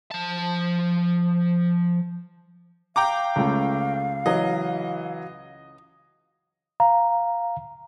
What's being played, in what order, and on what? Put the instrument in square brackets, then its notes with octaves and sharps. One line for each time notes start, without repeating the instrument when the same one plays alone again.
[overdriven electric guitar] F3 A5
[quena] F5 [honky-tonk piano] G5 A#5 D6
[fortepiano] C#2 [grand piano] A3
[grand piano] E3 F#3 [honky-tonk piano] D#5
[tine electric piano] F5 A#5